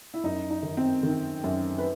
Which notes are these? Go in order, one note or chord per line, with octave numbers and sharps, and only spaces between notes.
E4
F#2 D#4
D#4
D#3
C4
D#3
F#2
B4